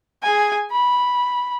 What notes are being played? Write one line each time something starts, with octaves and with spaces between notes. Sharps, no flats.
G#4 G#5
B5